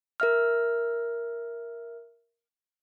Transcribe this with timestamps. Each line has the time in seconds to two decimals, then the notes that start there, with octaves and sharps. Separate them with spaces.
0.20 A#4 E5 F6